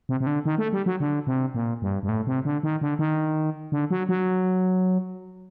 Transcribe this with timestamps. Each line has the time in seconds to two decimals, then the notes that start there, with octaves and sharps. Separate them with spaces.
0.09 C3
0.20 C3
0.27 D3
0.45 D#3
0.58 A3
0.73 G3
0.86 F#3
1.00 D3
1.27 C3
1.54 A#2
1.82 G2
2.03 G2
2.09 A2
2.27 C3
2.45 D3
2.63 D#3
2.81 D3
2.99 D#3
3.72 D3
3.91 F#3
4.09 F#3